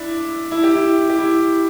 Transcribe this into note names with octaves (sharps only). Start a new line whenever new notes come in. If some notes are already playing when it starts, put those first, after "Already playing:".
Already playing: D4 E4
E4
G4
E4
G4
E4